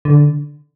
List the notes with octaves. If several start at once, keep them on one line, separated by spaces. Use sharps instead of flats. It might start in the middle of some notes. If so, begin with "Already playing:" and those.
D3